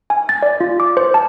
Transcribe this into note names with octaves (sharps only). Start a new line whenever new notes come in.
G#5
A6
D5
F4
D6
C5
A5